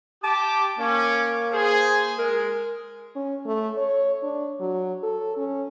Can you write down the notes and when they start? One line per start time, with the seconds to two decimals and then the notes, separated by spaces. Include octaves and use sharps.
0.24 G4 A5 D6
0.79 A#3 C#4 D6
1.52 G#4 C5
2.18 G#3 A#4
3.15 C#4
3.46 A3
3.77 C#5
4.23 D4
4.60 F#3
5.03 A4
5.37 C#4